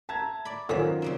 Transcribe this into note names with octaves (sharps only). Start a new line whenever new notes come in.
E5 A5 A#5 G#6
D5 B5
F#2 D3 D#3 C#4 F4 A#4 C5 B5
C#3 G3 C4